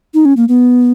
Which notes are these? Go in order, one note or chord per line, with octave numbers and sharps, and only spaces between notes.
D#4
C#4
A#3
B3